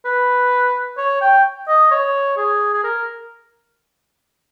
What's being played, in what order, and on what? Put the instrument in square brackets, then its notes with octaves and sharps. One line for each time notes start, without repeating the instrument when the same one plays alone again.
[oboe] B4
C#5
G5
D#5
C#5
G#4
G#4
A#4